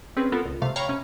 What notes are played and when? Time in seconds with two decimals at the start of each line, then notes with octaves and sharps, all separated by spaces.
0.17 C4 C#4 G#4 B4
0.32 B3 F4 A4 A#4
0.46 C#2
0.62 C3 A3 F5
0.76 C#5 F5 G5 A#5 B5 C#6
0.88 C3 C#4